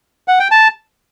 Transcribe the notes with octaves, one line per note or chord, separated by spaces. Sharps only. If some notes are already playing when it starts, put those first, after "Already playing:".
F#5
G5
A5